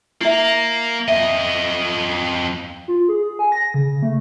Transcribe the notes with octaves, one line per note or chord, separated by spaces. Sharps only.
A#3 E4 E5
F2 D#5 E5
F4
G#4
G#5
A#6
C#3
A3